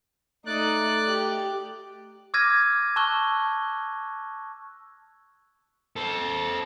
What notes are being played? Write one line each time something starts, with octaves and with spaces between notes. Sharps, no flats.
A3 D#4 D5 F#6
G4
D6 E6 F6 G#6 A#6 D#7
A5 C#6 E6 F#6 G7
A4 C5